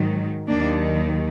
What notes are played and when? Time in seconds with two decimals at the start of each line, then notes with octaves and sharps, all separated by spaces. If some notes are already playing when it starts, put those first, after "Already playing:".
Already playing: G#2 D#3 F#3
0.48 D#2 D#3 F#3 A#3 D4